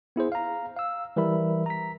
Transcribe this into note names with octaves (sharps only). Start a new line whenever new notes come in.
B3 E4 G#4 C5
F5 A#5
F5 E6
E3 G3 A#4 E5 B5
A#5 B6